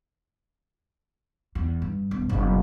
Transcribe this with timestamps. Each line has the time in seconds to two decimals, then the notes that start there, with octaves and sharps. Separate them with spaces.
1.55 E2
1.82 G2
2.11 E1
2.29 F#1 B1